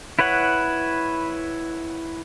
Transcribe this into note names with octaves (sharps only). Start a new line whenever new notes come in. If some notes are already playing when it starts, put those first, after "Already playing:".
E4 B4 C#5 F#5